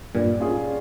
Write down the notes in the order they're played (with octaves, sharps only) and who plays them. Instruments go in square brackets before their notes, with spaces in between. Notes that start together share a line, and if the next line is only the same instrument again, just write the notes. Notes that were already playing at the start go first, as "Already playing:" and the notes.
[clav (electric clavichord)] G2 A#2 [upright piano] G3
[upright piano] C#4 F4 G#4